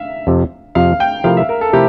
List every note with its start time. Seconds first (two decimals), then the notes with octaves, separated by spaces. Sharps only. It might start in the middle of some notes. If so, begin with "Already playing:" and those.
Already playing: E5 F5
0.27 F2 C3 F3
0.75 F2 C3 F3 F5
1.00 G5
1.24 C3 F3 A3 E4 A#4 F5
1.37 E5
1.49 A#4
1.61 A4
1.73 C3 F3 A3 E4 G4 A#4